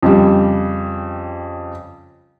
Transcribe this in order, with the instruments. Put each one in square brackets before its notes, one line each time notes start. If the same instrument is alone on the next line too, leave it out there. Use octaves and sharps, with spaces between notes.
[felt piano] F2 C#3 G3